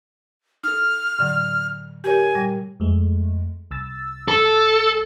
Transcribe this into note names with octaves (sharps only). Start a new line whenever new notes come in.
D#4 A4 F6
A2 D3 F#3
G4 A#4 C#5 G#5
A#2 G3
F2 G#3 A3
C2 E6 A6
A4